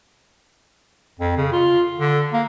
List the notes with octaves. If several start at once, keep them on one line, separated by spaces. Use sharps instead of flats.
F2
C#3
F4
D3
A#3